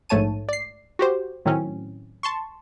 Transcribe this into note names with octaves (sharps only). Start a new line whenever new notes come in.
A#1 G#2 A3 C#5 A5 D#7
D5 C7
F#4 G4 C5
A2 D#3 F#3 C4 C#4
A5 C6 C#6